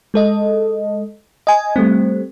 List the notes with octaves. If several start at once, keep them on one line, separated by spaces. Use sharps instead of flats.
G#3 A4 D#5
D#5 G#5
G3 A3 C4